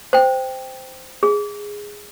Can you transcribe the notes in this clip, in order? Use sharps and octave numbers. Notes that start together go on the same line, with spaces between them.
C5 G5
G#4